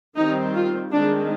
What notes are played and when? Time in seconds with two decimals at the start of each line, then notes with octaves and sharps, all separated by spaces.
0.16 D#3 G3 C4 D#4
0.54 F4
0.92 D#3 G#3 C4 D4